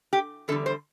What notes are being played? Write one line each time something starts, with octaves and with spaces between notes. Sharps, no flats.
G4
E2 D3 G3 A4
C5